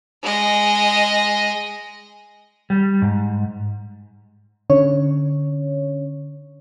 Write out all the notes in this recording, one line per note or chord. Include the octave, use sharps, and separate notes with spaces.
G#3 D#5
G3
G#2
D3 C#4 C#5